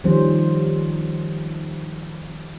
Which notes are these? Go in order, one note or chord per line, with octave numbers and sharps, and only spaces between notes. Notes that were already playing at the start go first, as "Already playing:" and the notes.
D#3 F3 G3 C#4 C5